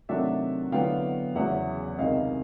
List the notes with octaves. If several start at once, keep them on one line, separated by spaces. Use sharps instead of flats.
C3 D#3 F#3 A3 D4 E5 F#5
D3 F#3 B3 E4 F5 G5
E2 C#3 F#3 E5 F#5
C#2 C3 D#3 D#5 F5